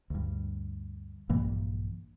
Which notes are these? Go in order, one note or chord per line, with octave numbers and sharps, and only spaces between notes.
D2 G2
A#1 G2 E3 A#3